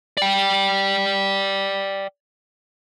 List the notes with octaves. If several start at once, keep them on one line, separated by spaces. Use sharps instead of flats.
D5 G5